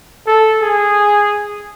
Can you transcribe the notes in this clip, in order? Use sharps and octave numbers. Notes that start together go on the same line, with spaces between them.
A4
G#4